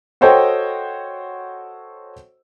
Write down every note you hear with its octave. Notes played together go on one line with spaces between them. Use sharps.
F#4 A4 C5 C#5 D#5 G5